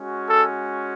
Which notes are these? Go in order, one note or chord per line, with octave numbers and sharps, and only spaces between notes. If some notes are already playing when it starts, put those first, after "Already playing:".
Already playing: G#3 C#4 F#4
A4